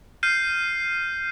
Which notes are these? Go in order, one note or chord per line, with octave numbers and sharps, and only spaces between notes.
F6 G6 C7 D#7